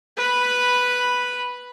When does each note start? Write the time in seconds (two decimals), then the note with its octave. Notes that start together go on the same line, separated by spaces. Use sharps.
0.17 B4 B5